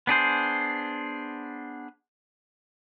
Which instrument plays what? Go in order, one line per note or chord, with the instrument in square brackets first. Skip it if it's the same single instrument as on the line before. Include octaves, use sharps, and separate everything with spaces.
[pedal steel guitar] B3 D4 G#4 C5